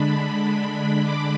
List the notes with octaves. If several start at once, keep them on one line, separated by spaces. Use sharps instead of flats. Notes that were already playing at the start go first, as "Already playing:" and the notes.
Already playing: D3 G#3 D4 B5
D6